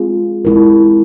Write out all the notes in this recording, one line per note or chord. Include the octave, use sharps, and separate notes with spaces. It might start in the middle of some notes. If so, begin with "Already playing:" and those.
Already playing: G#3 C4 F4 G#4
G#3 C4 E4 A#4